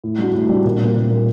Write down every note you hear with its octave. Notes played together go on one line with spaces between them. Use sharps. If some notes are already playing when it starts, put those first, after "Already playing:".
A2
G3 D4 F#4
A2
G3 D4 F#4
A#2
G3 A#3
A#2
G3 A#3